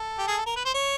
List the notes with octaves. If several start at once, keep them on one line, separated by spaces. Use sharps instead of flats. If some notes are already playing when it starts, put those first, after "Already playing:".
Already playing: A4
G4
G#4
A4
A#4
B4
C5
C#5